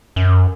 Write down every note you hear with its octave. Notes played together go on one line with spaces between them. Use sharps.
F#2